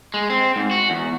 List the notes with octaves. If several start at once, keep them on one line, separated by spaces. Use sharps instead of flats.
G#3
C4
G#2
F#4
E2